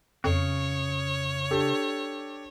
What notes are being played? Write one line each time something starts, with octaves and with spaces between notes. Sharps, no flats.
F2 C#3 C#5
D4 G4 A4